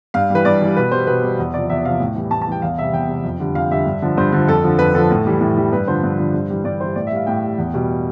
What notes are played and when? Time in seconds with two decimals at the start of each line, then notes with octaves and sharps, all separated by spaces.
0.14 G2 F5
0.30 E3 G3 B4
0.45 G2 D5
0.61 E3 G3
0.77 B2 B4
0.92 G3 C5
1.07 B2 B4
1.24 G3
1.39 E2
1.54 C3 F3 D5
1.70 E2 E5
1.85 C3 F3 F5
2.00 A2
2.15 E3 G3
2.31 A2 A5
2.42 A5
2.47 E3 G3 G5
2.62 E2 F5
2.78 C3 G3 E5
2.93 E2 G5
3.09 C3 G3
3.24 F2
3.40 D3 G3
3.55 F2 F5
3.71 D3 G3 E5
3.86 G2
4.02 D3 F3
4.17 G2 C5
4.32 D3 F3
4.48 F2 A4
4.64 D3 F3
4.79 F2 B4
4.94 D3 F3 A4
5.11 A2
5.26 E3 G3
5.41 A2
5.57 E3 G3
5.72 G2 B4
5.88 D3 F3 C5
6.03 G2
6.19 D3 F3
6.34 G2
6.50 E3 G3
6.64 G2 D5
6.80 E3 G3 C5
6.95 A2 D5
7.07 E5
7.12 G3 F5
7.27 A2 G5
7.42 G3
7.58 E2
7.74 B2 G3